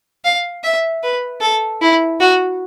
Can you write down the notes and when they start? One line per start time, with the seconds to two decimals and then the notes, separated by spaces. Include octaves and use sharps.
0.25 F5
0.64 E5
1.03 B4
1.41 A4
1.82 E4
2.20 F#4